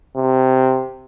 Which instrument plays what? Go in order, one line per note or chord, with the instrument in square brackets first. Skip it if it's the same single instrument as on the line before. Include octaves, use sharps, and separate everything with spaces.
[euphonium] C3